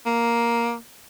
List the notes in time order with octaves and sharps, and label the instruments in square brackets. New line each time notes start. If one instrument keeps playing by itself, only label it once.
[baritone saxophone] A#3